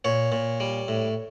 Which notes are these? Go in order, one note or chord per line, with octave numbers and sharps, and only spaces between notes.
A#2 C#5
A#2
G3
A2